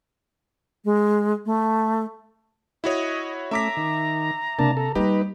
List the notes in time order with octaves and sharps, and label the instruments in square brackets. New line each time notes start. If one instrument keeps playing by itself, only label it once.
[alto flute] G#3
A3
[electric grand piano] E4 F#4 C#5 [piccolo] D#5
[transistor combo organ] A3 C#4 [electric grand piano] E5 D6 B6 [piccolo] A#5
[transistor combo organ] D#3
[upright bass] C3 [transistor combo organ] A#3 D4 A5
[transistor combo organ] A4
[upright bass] G3 A#3 [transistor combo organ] D#4 B4 [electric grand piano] G4